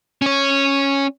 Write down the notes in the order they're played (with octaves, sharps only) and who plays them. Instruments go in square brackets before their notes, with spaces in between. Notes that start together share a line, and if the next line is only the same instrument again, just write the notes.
[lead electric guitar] C#4 C#5